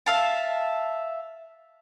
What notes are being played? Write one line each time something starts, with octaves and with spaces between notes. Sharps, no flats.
E5 F5 A5